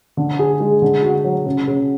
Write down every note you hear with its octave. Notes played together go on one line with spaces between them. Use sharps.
D3
G#4
G#3
D3
F#4
F#3
C#3
C#3